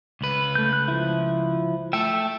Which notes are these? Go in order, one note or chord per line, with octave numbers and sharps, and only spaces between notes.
C#2 B4
A3 G6
F#6
F3 E4
A3 A4 E5 G5 E6